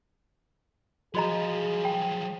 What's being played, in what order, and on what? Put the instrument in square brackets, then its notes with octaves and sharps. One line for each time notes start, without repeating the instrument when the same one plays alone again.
[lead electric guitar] F3 F#3 [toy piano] F#4 D#5 A#5 [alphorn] G#4
[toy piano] G5